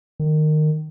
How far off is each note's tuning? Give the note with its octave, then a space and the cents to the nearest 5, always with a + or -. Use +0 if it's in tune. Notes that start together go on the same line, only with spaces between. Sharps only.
D#3 -20